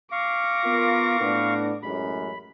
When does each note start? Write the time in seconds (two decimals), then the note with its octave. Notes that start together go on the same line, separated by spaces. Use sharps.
0.12 F5 C#6 D6 A#6
0.65 B3 F4 A#4
1.21 A2 B3 D4
1.83 A1 F#2 G#3 B5